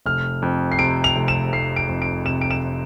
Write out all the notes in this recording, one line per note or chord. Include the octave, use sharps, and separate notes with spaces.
F1 F6
F2
C7
C3 D7
F7
F1
E7
F1 C7
D7
F2
D7
C3 E7
D7
E7